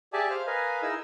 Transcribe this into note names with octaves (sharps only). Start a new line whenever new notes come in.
G4 G#4 D5 E5 G#5 A5
C5 F5 F6
A#4 B4 D#5 F5 G#5
D#4 E4 G#4 A#4 D#5 E6